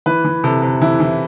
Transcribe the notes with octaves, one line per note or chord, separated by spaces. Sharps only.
E3 B4
E3
C3 A4
C3
E3 E4
E3